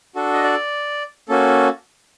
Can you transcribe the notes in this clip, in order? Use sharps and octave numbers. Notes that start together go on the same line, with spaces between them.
D4 F#4 A4
D#5
D5
A#3 C#4 F#4 A4